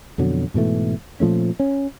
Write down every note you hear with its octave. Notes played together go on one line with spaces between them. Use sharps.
F2 B2 D3 F#3
G#2 B2 E3 A3
A#2 F3 A3 C#4
C#4